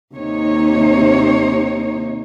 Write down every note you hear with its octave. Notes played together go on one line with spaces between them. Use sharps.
D#2 C3 D#4 C#5